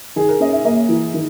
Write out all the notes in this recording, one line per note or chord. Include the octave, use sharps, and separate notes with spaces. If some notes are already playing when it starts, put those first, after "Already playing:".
D#3 G#4
A#4
C#4 D#5
E5
A#3 D#5
E3
D#3